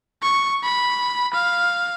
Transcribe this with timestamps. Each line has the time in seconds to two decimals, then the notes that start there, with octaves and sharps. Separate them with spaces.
0.22 C#6
0.64 B5
1.34 F5